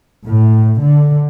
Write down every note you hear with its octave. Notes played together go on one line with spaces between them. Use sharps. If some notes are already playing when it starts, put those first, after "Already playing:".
A2
D3